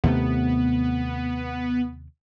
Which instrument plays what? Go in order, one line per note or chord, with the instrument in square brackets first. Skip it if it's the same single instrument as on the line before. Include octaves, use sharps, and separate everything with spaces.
[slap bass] D#2 C3 A3 [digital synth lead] B3